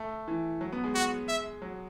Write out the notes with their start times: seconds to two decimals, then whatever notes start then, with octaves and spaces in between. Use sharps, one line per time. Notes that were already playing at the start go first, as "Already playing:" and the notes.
Already playing: A3
0.28 E3
0.61 F#3
0.72 B3
0.84 G#3
0.95 F#4
1.28 E5
1.62 F#3